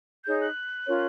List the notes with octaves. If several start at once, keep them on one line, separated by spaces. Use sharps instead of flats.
D#4 G#4 C#5 G6
F#6
C#4 F4 A#4 C#5